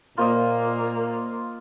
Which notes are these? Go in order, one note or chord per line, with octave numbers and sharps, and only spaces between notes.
A#2 A#3 F4 C5 D#5